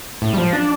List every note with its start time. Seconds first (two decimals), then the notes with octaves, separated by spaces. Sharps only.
0.22 A2
0.33 G3
0.38 F3
0.53 D4